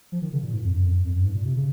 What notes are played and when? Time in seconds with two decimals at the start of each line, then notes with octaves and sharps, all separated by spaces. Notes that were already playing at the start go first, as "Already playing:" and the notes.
0.12 F3
0.22 D#3
0.32 C#3
0.43 A#2
0.53 G#2
0.64 F2
0.74 F#2
0.84 F2
0.94 F#2
1.04 F2
1.15 F#2
1.24 G#2
1.35 A#2
1.45 C3
1.56 C#3